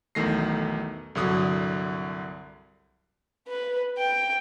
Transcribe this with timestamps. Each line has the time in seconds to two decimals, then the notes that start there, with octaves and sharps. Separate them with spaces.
0.15 B1 E2 D#3 A3 A#6 C7
1.15 C2 G2 D3 F#3 D#6
3.48 B4
3.99 G5